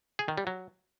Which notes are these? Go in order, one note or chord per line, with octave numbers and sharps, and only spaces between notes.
G#4
D#3
G3
F#3